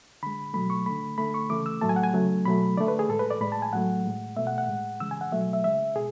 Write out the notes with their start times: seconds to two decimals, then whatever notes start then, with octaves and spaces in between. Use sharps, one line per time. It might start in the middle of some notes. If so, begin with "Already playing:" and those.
0.23 D3 G#3 B5
0.54 B2 F#3 A3 B5
0.70 C#6
0.86 D3 A3 B5
1.18 D3 A3 B5
1.34 C#6
1.50 C#3 E3 A3 D6
1.66 E6
1.81 A2 F#3 A3 A5
1.89 G#5
1.96 F#5
2.03 G#5
2.13 C#3 F#3 A3
2.45 B2 F#3 A3 B5
2.77 D3 D5
2.81 A3
2.88 B4
2.99 G#4
3.09 A2 G#3 A4
3.19 B4
3.31 D5
3.41 A2 G#3 B5
3.52 A5
3.62 G#5
3.73 A2 F#3 A3 F#5
4.05 A2 G#3
4.37 B2 A3 E5
4.47 F#5
4.58 F#5
4.68 A2 G#3
5.00 C#3 E3 G#3 E6
5.11 G#5
5.21 F#5
5.32 B2 F#3 A3 E5
5.53 E5
5.64 C#3 G#3 E5
5.95 B2 G#4